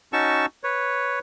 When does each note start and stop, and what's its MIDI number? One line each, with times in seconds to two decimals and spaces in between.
0.13 0.46 61
0.13 0.46 63
0.13 0.46 66
0.13 0.46 81
0.13 0.46 85
0.13 0.46 88
0.64 1.19 71
0.64 1.19 73